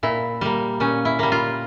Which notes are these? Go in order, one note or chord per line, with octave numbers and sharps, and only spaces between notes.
A#2 E4
G3 A#3
A#2 C#4
E4
G3 A#3
F4